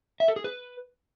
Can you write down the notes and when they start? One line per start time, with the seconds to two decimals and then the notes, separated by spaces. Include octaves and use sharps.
0.20 E5
0.28 A4
0.36 G#4
0.44 B4